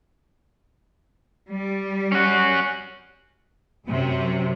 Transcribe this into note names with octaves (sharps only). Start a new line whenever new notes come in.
G3
C#4 F#4
F#2 C3